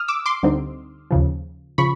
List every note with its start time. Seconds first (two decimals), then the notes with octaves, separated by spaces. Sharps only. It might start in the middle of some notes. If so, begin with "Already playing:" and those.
Already playing: D#6 F6
0.08 D6 E6
0.26 C6 D6
0.43 D2 D3 G3 C4 D#4
1.11 D#2 C#3 F3
1.78 C#3 F3 B5 C#6